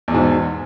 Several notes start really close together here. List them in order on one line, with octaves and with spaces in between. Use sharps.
E2 B2 G#2